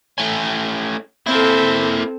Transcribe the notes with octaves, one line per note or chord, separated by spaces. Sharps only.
A3 C#4
A#3 C4 E4 A4